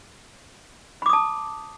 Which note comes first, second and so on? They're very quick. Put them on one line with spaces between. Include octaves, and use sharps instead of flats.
B5 D6 D#6 A5